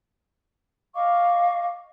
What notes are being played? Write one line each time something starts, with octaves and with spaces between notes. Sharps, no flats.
D#5 F5 C#6 D6